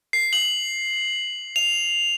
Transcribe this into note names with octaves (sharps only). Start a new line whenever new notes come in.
C7
F#7
F7